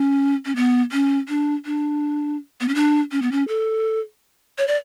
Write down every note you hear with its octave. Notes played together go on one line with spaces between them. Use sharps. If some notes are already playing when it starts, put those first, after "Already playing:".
Already playing: C#4
C#4
B3
C#4
D4
D4
B3
C#4
D4
C#4
B3
C#4
A4
C#5
D5